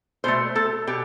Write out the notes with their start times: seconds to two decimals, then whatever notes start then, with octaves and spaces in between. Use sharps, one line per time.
0.24 B2 A3 C5
0.56 A4
0.87 B2 G4